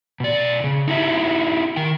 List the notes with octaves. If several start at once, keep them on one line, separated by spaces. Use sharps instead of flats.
B2 D5
C#3
D#4 E4 F#4 G4 B4 E5
D#3 G5